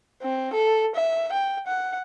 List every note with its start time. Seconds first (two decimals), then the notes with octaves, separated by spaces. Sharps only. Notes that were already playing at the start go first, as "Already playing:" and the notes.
0.22 C4
0.53 A4
0.95 E5
1.32 G5
1.67 F#5